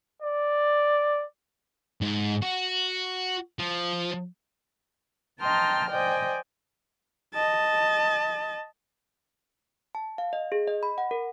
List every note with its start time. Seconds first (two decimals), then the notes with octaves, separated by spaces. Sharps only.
0.23 D5
2.01 G#2
2.42 F#4
3.59 F3
5.41 D#5 G5 A5 A#5 C6 F6
5.89 C5 D5 D#5 G5 G#5
7.34 D#5 A5
9.95 A5
10.18 F5
10.33 D#5
10.52 G#4
10.67 D#5
10.83 B5
10.98 F#5
11.11 A#4